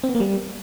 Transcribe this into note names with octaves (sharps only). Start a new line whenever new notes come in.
C4
B3
A#3
G3